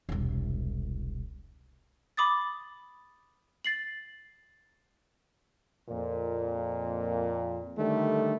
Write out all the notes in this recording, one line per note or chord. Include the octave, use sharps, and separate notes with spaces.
E1 C2
B5 D6 D#6 A6
A6 C7 F#7
F2 A#2
D3 D#3 G3 A3